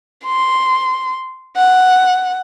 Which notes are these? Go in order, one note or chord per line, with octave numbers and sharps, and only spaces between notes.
C6
F#5